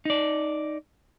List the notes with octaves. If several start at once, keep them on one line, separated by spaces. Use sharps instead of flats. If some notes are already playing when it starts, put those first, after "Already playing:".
D#4 D5